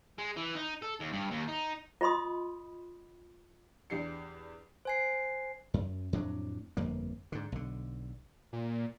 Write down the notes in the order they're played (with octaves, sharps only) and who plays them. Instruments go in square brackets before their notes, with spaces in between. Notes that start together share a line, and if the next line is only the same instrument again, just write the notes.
[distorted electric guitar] G#3
E3
D#4
A4
D#2
G2
D#2
D#4
[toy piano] F4 D#5 B5 C6 D#6
[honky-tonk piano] E2 D4 G4 C7 C#7
[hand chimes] C5 G#5 C7
[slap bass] F#2
F2 A2 F#3 D4
G1 F2 A#3
G#2 D3
B1 D3
[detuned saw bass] A#2